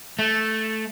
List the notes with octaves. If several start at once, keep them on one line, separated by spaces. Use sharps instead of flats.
A3